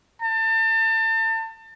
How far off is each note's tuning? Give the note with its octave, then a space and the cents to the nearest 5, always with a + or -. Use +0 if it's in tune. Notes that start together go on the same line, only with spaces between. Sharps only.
A5 +35